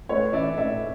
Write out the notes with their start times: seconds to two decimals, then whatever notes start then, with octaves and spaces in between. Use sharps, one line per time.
0.09 A2 B4 C#5
0.33 E3 D5 E5
0.57 A2 D5 E5